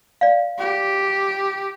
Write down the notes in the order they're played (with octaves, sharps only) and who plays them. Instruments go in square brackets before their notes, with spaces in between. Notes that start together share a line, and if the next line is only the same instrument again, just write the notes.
[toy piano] D5 F5
[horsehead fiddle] G4